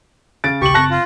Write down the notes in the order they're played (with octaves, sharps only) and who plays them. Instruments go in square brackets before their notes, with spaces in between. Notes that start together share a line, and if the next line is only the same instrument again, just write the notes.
[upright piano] C#3 A6 D7
[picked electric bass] D#1 B1 C#3 [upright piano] G4 F#7 [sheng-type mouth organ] C#6
[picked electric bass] F#1 C#3 C4 [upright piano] A5 F#6 A#6
[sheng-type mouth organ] F4